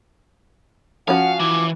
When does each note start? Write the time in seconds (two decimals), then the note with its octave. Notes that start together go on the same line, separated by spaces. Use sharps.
1.08 F3 C#4 F#4 F5 F#5
1.40 E3 E4 D6